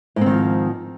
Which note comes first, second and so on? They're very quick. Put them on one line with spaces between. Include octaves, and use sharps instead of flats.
G#2 C4 D#3 F3